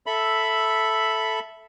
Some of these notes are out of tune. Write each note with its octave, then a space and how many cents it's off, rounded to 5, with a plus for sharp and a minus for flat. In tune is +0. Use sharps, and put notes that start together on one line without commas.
A4 +0 E5 +0 B5 +0